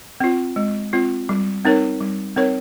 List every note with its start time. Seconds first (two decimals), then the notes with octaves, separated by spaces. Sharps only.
0.20 C4 F4
0.56 G#3
0.93 C4 F4
1.29 G3
1.65 C4 D#4 A#4 C#5
2.01 G3
2.36 C4 D#4 A#4 C#5